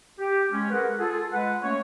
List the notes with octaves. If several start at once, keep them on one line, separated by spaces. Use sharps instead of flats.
G4
G#3 C#4
G#4 A#4 B4 F#5
F4 G#4 A4
G#3 B4 F#5
A3 A#3 C#4 C#5